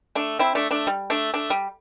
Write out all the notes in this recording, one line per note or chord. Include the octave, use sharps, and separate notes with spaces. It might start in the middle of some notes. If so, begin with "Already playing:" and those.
A3 D4
C4 E4
A3 D4
A3 D4
G3
A3 D4
A3 D4
G3